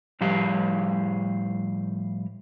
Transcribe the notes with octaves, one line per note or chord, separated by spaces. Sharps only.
A2 F3 G3 G4 F5 A#5